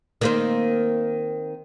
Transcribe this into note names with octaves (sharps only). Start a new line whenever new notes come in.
D#3 A#3 C4